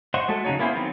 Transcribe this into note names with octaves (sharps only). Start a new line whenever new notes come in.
C5 D#5 F#5 C6 C#6
G#3 A3 F#4 A4
C#3 F#3 D#4 C#5
A#3 B3 E4 G#4 C5
D#3 F#3 B3 C4